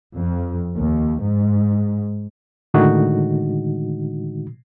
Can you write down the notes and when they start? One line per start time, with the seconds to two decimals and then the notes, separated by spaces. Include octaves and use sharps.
0.16 F2
0.77 D#2
1.22 G#2
2.74 A2 D3 D#3 G#3 D#4 F#4